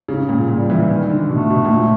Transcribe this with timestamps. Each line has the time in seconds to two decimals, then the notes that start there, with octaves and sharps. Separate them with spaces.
0.08 C#3
0.29 A#2
0.48 A#2 G3
0.70 E3
0.89 D#3
1.10 D3
1.29 B2 A3
1.50 B2
1.65 A#2
1.70 A2